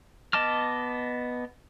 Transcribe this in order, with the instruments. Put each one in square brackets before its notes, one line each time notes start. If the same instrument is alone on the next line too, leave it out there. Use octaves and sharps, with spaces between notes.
[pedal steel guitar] B3 D#5 A5 D6 F6